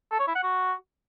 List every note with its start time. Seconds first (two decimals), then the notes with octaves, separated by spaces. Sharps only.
0.11 A4
0.19 C#5
0.27 E4
0.35 F#5
0.43 F#4